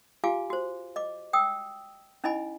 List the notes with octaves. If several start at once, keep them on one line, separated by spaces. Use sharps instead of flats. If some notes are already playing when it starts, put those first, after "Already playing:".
F4 G4 F5 G#5 D6
F#4 C5
D#5 D6
G5 D#6 E6
C#4 D#4 E4 D#5 G#5 B5